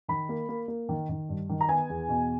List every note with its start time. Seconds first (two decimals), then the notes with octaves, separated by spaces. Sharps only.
0.08 D#3 B5
0.29 A#3
0.49 A#3
0.68 A#3
0.89 D#3
1.09 D#3
1.29 G2
1.49 D#3
1.61 A#5
1.69 B3 G#5
1.90 E2
2.09 B2